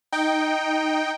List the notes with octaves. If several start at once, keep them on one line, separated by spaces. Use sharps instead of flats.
D#4 G5